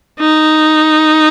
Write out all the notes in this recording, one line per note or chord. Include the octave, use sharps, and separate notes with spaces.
D#4